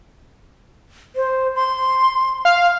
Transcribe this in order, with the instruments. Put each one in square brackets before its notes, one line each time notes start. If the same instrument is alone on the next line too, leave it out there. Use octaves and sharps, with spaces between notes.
[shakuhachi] C5
C6
[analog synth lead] F5